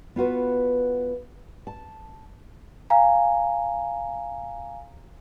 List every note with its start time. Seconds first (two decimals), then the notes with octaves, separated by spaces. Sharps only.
0.16 B3 F4 F#4 B4
1.67 A5
2.90 F5 G#5 A#5